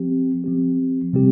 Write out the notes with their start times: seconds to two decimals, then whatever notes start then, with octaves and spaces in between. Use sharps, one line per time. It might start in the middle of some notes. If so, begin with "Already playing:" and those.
Already playing: F3 C4 G4
0.44 F3 C4 G4
1.13 C3 G3 C4 G4